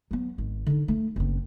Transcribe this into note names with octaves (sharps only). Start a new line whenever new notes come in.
F#3 B3
G#1
D3 D#4
A3
F#1 C4